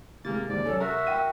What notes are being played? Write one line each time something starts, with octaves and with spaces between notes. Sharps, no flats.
C3 G#3 A#3 A6
D#2 G#2 D5
F#3 C#4 A4
F#4 A#4 E5
G5 D#7